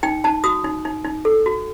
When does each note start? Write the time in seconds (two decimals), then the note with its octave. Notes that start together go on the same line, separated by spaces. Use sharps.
0.03 D#4 G5
0.24 D#4 A5
0.44 F#4 D#6
0.64 D#4
0.85 D#4
1.05 D#4
1.25 A4
1.46 F#4